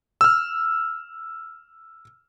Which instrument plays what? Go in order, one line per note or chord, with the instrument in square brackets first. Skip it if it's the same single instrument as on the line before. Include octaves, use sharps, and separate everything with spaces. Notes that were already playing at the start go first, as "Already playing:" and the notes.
[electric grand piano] E6 F6